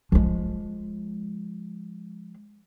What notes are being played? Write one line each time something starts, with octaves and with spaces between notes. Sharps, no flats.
F3 G#3